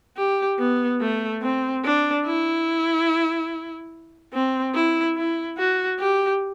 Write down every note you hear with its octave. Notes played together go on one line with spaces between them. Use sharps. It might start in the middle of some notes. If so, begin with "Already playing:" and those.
G4
B3
A3
C4
D4
E4
C4
E4
E4
F#4
G4